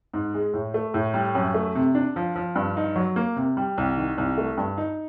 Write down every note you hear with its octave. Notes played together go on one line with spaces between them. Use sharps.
G#2
G#3
A2
A3
A2
G3
F#2
A3
C3
D4
F3
F3
G2
D#4
F#3
A#3
C3
G3
C2
D#3
C2
A3
G2
D#4